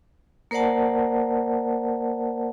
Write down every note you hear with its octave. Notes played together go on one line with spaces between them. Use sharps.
A#3 A#4 C5 D5 F#5 A5